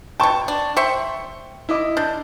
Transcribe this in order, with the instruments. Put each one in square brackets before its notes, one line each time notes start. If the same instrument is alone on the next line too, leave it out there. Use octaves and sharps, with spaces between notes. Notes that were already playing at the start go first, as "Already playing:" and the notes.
[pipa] B2 A5 [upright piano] G5 C#6
[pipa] D4
[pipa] C5 E5 C#6 [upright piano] G5
[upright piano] E4 D#5 D6
[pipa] D4 [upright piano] G6